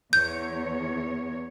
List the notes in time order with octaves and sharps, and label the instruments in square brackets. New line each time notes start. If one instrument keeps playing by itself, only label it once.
[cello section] E2 C#5 [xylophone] G6